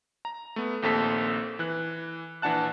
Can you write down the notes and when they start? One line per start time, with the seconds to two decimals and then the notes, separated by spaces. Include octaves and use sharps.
0.25 A#5
0.56 A3 B3
0.83 A#1 D#2 C4 A4 B6
1.59 E3 F#6
2.42 A#1 E3 D4 F#5 A5 F#6